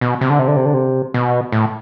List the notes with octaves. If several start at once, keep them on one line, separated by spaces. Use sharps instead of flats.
B2
C3
D3
C3
D3
C3
D3
C3
B2
A2